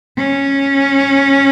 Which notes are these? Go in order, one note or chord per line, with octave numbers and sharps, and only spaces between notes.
C#4